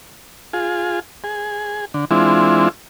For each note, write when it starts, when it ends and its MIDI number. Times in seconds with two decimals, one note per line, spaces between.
0.53 1.00 65
0.53 1.00 68
1.24 1.85 68
1.94 2.05 50
2.11 2.69 52
2.11 2.69 56
2.11 2.69 60
2.11 2.69 62
2.11 2.69 64
2.11 2.69 65